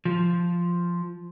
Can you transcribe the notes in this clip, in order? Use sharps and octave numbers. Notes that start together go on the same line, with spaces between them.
F3